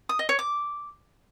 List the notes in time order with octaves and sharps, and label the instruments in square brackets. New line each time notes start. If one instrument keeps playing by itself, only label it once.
[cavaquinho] D#6
D#5
C#5
D6